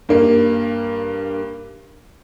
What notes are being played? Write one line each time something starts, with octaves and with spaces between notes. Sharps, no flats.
G2 A#3